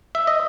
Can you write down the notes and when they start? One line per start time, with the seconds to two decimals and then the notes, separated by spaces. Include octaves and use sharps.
0.15 E5
0.27 D#5